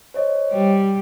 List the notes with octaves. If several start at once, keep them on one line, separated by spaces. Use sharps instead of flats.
C5 C#5 D#5
G3